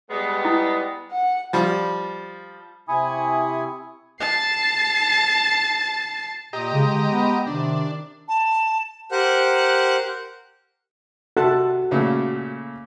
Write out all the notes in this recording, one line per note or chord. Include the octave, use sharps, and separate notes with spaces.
G3 G#3 B3
E4
F#5
F3 G3
C3 E4 G#5 B5 C#6 D#6
A5 C7
A#2 G4 D#5 A#5
C#3 G#3
D3
B3
C3 D#3 D4
A5
G4 A#4 C5 F#5 F#6
C3 F#4 A4 A5 F#6
A#2 C#3 A3